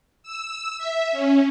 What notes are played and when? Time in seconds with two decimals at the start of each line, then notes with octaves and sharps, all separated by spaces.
0.23 E6
0.78 E5
1.12 C#4